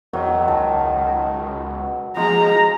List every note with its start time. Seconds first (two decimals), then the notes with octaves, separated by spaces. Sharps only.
0.13 E2 D#3 F#3
0.48 C#2 A5
1.70 B2
2.17 F3 G#3 A#5